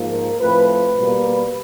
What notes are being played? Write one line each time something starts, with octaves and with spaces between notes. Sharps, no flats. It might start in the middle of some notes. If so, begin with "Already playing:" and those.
Already playing: G#2 F3 A#3
A#4
A2 F3 A3 C4 B4
B4
B2 G3 A#3